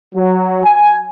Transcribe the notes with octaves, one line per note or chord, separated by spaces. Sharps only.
F#3
G#5